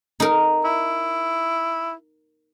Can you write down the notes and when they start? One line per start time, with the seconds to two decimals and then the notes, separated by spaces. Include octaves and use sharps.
0.20 D#4 A#4
0.64 E4